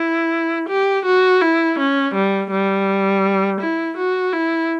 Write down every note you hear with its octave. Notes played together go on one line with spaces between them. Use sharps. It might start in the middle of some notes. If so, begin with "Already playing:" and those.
Already playing: E4
G4
F#4
E4
C#4
G3
G3
E4
F#4
E4